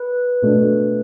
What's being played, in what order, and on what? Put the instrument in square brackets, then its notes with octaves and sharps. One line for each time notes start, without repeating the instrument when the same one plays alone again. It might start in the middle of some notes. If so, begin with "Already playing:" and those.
Already playing: [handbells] B4
[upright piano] B2 A3 D4